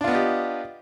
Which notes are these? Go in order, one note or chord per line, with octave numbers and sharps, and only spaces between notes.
B3 D4 F4 G4 D#5